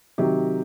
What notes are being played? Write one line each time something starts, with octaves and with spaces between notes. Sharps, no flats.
C3 D#3 F#3 G4